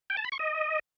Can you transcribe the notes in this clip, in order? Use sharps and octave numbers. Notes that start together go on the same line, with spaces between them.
G5
A5
B5
C#6
D#5